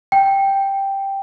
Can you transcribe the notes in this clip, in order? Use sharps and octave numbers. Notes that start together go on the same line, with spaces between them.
G5